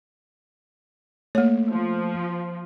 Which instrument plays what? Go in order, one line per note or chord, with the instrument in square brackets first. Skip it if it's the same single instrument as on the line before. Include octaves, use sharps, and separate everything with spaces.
[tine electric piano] A3 [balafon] A#3 C#5
[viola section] F3